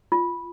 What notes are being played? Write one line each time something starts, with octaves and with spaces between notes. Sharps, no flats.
F4